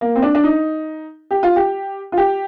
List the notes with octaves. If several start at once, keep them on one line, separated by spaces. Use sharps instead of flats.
A#3
C4
D4
D4
D#4
G4
F4
G4
F4
G4